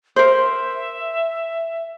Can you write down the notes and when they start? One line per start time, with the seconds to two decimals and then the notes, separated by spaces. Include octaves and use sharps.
0.16 A#4 C5 E5